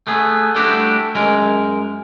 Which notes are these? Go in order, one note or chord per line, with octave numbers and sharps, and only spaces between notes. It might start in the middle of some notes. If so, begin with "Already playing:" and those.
A3 B3 G#4
G3 A3 D4 E4 F#4 G4
F#2 G#3 A#4